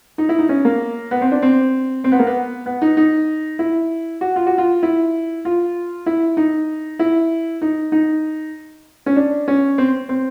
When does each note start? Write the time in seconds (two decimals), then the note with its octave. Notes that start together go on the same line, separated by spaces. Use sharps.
0.18 D#4
0.29 E4
0.39 D#4
0.49 C#4
0.65 A#3
1.11 B3
1.21 C4
1.31 D4
1.42 C4
2.04 C4
2.12 B3
2.19 A#3
2.27 B3
2.66 B3
2.82 D#4
2.97 D#4
3.59 E4
4.21 F#4
4.36 F4
4.47 F#4
4.58 F4
4.83 E4
5.45 F4
6.06 E4
6.37 D#4
6.99 E4
7.62 D#4
7.92 D#4
9.06 C#4
9.16 D4
9.48 C#4
9.78 C4
10.09 C4